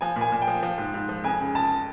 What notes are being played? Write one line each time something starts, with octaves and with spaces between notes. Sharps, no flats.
F3 G#5
A#2
G#5
A#2
G5
F3
F3
G#2
G#2
F3
F2 G#5
C#3
C#3 A5